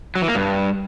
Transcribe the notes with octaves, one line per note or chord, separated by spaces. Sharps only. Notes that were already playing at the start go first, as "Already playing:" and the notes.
F#3
E3
A#3
G2